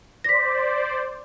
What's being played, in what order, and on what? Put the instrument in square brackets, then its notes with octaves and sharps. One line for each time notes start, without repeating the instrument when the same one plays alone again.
[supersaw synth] C5 D5 [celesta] A#6 B6